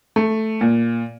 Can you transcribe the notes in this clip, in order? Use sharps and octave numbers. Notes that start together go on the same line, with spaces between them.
A3
A#2